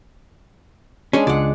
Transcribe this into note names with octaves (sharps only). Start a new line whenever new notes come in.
G#3 C#4 D4
C#2 D5 F#5